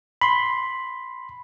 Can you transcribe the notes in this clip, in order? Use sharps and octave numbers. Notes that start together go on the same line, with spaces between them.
B5 C6